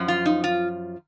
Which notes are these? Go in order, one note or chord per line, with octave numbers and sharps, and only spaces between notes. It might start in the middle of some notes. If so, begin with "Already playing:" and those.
Already playing: F#2 F3
F4
D#4
F4